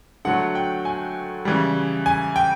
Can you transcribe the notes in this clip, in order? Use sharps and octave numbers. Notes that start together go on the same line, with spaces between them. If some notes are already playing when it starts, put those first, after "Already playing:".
D3 F#3 A3 F#5
G5
G#5
C#3 E3 G3
G#5
G5